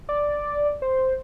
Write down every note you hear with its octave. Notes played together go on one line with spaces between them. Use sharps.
D5
C5